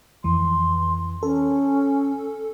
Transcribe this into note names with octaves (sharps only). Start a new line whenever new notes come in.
F2 E3 C6
C#4 A4